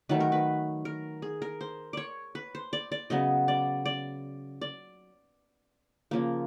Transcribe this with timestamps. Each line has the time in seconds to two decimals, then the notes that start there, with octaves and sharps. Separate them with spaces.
0.09 D#3 F#3 A3 B4
0.20 A#4
0.32 B4
0.85 A#4
1.22 G#4
1.42 A#4
1.61 C5
1.93 C#5 D5
2.35 B4
2.55 C5
2.73 D5
2.92 D5
3.10 C#3 F#3 B3 D#5
3.48 D5
3.85 D5
4.61 D5
6.11 C#3 F3 A#3